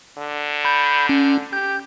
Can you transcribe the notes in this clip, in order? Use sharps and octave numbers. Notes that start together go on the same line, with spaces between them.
D3
B5 G6
C#4
G4 G6